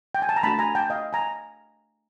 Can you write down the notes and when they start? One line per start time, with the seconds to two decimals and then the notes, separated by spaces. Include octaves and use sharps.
0.15 G5
0.22 G#5
0.29 A5
0.36 A#5
0.43 A3 D4 F#4 A5 B5
0.59 G#5 A#5
0.75 G5 A5
0.90 D#5 F5
1.13 G#5 A#5